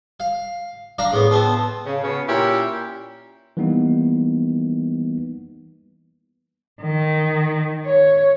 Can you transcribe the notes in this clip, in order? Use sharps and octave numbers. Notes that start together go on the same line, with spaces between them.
F5
D4 F5 A#5
A2 B3 G#4
B3 C4 F4 A5
C#3
C#3 B3 C#4 F#4
A#2 C#4 E4 G4
E3 G3 A#3 B3 D#4
D#3
C#5